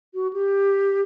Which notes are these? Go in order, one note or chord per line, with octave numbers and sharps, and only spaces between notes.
F#4
G4